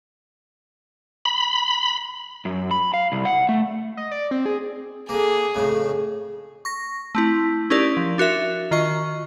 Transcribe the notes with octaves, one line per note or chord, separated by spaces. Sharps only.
B5
F#2
B5
F5
C2
F#5
A3
D#5
D5
C4
G#4
D3 A#3 G#4
F2 A2 C#3
C#6 A#6
A3 C4 E4
C#4 D#4 E4 G4 A#4 D5
F3
D4 F#4 A#4 E5
D#3 F4 D#5 C#6